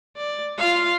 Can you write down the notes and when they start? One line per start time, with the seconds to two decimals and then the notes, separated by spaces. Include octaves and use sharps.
0.17 D5
0.58 F4 F5